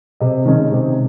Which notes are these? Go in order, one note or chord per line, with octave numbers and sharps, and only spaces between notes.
C3 D#5
D#3 G#3 C#4
C3